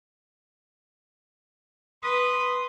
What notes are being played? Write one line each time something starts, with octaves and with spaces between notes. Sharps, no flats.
B4 C6 D#6